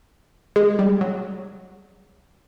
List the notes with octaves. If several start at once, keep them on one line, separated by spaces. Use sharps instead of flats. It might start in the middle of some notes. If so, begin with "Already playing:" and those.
G#3
G3
F#3